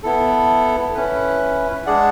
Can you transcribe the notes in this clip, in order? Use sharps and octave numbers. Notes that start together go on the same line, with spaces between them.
B3 E4 A4
C#4 E4 B4
G#3 D4 G#4 D5 F#5